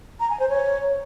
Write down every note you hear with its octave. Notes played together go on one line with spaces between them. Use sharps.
A#5
G#5
C5
C#5